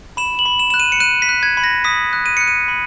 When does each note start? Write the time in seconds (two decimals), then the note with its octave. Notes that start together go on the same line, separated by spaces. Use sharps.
0.17 B5 E7
0.39 F#7
0.46 B5
0.59 E7
0.70 F#6 E7
0.80 D#7
0.92 C#7
1.00 F#6 D#7
1.22 B6
1.29 F#6
1.43 G#6
1.57 B5
1.64 A#6
1.84 D#6 B6
2.13 F#6
2.26 D#7
2.37 F#6 C#7
2.47 D#7
2.68 B5